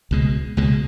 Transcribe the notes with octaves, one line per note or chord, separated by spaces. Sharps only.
C#2 B2 G#3
C#2 B2 G#3